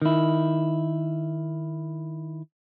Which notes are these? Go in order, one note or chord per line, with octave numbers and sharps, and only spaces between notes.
D#3 E4